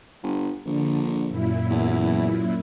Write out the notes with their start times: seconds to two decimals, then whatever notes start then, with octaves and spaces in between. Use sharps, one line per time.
0.23 G1
0.66 A#1 D3
1.28 F#2 A#2 E4
1.70 E2